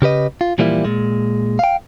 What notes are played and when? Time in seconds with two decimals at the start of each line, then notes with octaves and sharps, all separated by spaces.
0.02 C#3 G4 B4 D#5
0.41 F4
0.58 A#2 E3 F3 G3 A#3 E4
0.85 A#2 G#3
1.59 F5 G5